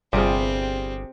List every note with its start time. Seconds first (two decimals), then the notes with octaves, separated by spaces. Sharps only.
0.13 G1 C3 G3 C4 F4 G#4